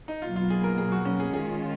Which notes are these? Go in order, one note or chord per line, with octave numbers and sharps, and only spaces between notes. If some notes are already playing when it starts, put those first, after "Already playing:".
D#4
B2 F#3 A#3 F4
F4
G#4
A#4
G#4
F#4
C#4
G#4
D#3 G#3 C#4 F4 G#4